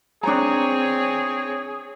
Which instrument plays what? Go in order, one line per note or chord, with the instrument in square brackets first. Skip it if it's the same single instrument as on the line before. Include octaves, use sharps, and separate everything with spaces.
[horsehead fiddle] C4 C#5 [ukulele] D4 A#5 [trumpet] G#4